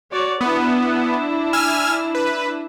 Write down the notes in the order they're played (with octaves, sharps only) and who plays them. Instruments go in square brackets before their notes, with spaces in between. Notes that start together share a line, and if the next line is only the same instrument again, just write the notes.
[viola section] F#4 C#5 D5
[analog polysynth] B3 [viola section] D4 E4
[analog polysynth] G#5 E6 F6
B4